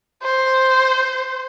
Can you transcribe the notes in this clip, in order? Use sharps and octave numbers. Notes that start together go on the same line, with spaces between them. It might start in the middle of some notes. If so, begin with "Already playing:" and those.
C5